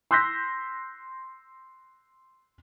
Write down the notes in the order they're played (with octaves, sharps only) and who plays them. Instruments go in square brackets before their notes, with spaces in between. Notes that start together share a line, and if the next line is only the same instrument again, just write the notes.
[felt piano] C6 E6 F#6 G6 A#6 B6